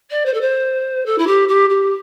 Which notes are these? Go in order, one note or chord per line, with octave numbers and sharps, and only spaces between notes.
D5
C5
A4
C5
A4
E4
G4
G4
G4